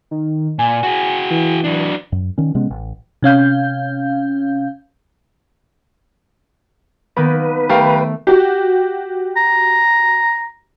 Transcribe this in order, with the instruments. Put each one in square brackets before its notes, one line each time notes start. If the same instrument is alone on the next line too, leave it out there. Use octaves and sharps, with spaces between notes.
[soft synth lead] D#3
[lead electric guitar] A#2 [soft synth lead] G#5
[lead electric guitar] F#4 G#4
[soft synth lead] E3
[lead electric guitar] F#3 D4
[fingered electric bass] F#2
D#3 C#4
C3 G#3 B3 C#4
A1
[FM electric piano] C3 C#4 F5 G6
[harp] D#3 A#3 B3 [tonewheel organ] B4
[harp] A3 [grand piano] G4 A#4 F5
[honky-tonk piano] F#4 G4
[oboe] A#5